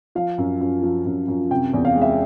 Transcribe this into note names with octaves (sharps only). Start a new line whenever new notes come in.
F3 F5
F#2
F#2
F3
F#2
F#2
C3 G5
E2
F5
G#3
E5